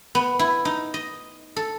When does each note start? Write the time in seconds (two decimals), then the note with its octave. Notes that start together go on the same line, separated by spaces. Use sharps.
0.15 B3
0.39 E4
0.65 D#4
0.94 D#5
1.56 A4